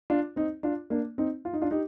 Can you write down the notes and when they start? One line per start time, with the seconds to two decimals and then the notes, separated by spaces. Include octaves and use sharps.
0.10 D4 F4
0.36 C4 D#4
0.63 D4 F4
0.90 A#3 D4
1.18 C4 D#4
1.45 F4
1.53 D#4
1.62 D4 F4
1.71 D#4 G4